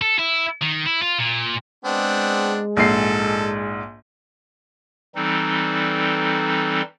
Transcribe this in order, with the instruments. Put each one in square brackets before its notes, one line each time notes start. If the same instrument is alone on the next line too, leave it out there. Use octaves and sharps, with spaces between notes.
[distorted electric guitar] A4
E4
D#3
E4
F4
A#2
[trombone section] G#3 [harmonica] B3 C4 D4
[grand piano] A#1 G#2 C7 [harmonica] A4
[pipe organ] E3 G3 C4 D#4 A4